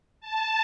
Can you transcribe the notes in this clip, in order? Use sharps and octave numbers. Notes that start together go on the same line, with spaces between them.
A5